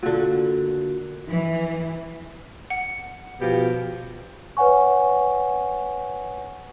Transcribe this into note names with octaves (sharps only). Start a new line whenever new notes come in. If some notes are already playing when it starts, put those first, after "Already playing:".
A#2 D3 F#4
E3
F#5
B2 F3 G4
B4 C#5 F#5 G#5 C#6